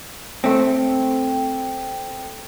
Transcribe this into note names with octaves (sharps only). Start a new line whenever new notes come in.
A3 C4